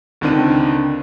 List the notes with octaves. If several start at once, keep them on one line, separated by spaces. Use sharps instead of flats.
C#2 D3 D#3 C4 D4 D#7